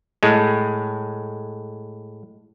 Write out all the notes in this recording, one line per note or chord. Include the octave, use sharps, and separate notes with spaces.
A2 G#3